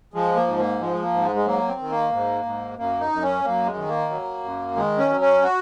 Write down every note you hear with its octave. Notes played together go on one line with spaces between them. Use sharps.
F3 G#3
A#3
G#2
A#3
F3 G#3
A#3
G#2
G#3
G#3
F#3 A#3
C4
D#3
A#3
G#2
G#2
F#2 A#3
D#4
F#2
C#4
F#2 A#3
G#3
D#3
A#3
F#3
F#2
D#3 G#3
C#4
F#3
C#4
F#4